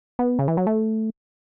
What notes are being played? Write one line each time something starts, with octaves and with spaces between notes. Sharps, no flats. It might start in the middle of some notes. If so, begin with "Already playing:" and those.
B3
C#3
E3
F#3
A3